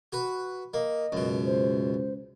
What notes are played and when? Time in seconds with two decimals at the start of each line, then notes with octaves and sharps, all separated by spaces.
0.13 F#4 B4
0.74 A#3 D#5
1.12 C#2 F#2 B2
1.46 C5